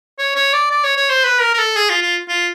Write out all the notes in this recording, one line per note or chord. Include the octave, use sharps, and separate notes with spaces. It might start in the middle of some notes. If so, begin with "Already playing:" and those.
C#5
C#5
D5
D5
C#5
C#5
C5
B4
A#4
A#4
A4
G#4
F4
F4
F4